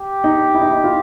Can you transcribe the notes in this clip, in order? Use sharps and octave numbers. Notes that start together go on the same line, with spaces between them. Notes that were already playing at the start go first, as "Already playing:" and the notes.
Already playing: G4
D#4
E4
D#4
E4
F4